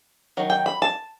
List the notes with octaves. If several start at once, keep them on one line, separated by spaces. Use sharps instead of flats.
D#3 F#3
G5
B5
A5